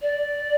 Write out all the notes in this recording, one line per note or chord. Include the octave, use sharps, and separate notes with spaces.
D5